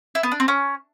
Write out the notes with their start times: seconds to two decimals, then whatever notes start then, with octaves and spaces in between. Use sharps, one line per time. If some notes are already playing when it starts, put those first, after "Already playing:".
0.15 E4
0.23 B3
0.32 D4
0.40 C4
0.48 C#4